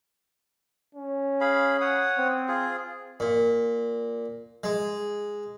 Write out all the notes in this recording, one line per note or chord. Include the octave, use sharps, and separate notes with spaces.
C#4
G#4 F5 B5
C#5 F#5 D#6
C4
F4 G#4
A#2
G#3